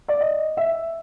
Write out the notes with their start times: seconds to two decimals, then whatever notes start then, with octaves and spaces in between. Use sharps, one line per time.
0.08 D5
0.21 D#5
0.57 E5